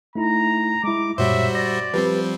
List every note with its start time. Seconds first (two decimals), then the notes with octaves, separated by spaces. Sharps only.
0.15 A3 D#4 E4 A#5
0.84 G#3 E4 D6
1.18 F#2 A#2 G3 F#4 C5 C#5 E5
1.55 D5 A#6
1.94 F3 G3 C4 G4 B4